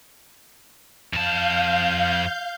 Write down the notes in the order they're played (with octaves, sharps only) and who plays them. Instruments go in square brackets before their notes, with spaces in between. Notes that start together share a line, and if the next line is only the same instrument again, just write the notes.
[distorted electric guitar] F2 A5 [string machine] F5 G6